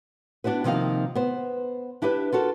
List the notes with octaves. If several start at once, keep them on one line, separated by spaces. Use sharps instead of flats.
B3 D4 E4 F#4 B4
C3 D#3 F3 A#3 D#4 F5
B3 C5
D4 E4 G4 B4 E5
F4 F#4 A4 A#4